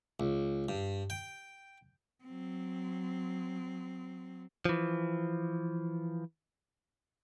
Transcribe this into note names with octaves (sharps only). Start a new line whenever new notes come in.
C#2
G2
G5
F#3 C4
E3 F3